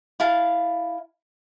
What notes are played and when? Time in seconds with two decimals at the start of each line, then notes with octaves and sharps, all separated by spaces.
0.20 E4 F5 A5